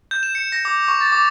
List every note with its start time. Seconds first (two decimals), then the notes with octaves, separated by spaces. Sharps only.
0.11 G6
0.23 E7
0.35 C#7
0.52 A#6
0.65 D6
0.88 C#6
1.00 A6
1.12 D6